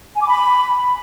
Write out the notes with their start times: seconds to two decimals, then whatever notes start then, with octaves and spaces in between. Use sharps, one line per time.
0.14 G#5
0.21 D6
0.27 B5